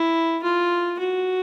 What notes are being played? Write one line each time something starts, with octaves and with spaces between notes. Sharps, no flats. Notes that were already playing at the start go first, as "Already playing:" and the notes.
Already playing: E4
F4
F#4